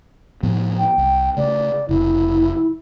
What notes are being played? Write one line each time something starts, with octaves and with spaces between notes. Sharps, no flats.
A2 F3 B3
G5
C2
C#3 A3 D5
F1 C#3 E4